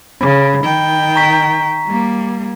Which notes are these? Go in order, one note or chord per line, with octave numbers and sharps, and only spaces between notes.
C#3 B5
D#3 G5
A#5 C#6 B6
G3 A#3